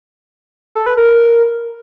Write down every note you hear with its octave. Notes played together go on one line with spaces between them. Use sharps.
A4
B4
A#4